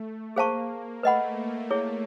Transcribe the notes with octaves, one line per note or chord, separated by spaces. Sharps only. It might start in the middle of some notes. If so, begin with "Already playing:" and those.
Already playing: A3
A#3 G#4 C5 F5 A5 C#6
A3 B4 D#5 F#5 B5
E4 G#4 C#5